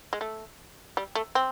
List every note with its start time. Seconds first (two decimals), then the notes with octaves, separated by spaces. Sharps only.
0.13 G#3
0.21 A3
0.97 G3
1.15 A3
1.35 C4